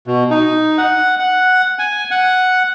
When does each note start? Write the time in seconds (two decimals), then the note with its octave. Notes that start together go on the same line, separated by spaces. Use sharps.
0.07 B2
0.31 D#4
0.78 F#5
1.20 F#5
1.79 G#5
2.11 F#5